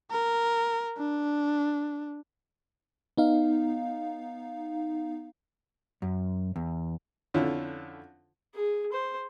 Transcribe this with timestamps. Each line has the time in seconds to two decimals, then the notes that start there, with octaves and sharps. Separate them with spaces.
0.11 A#4
0.98 D4
3.17 B3 D#4 F5
6.02 F#2
6.56 E2
7.34 F2 D3 C#4 E4 F4
8.55 G#4
8.92 C5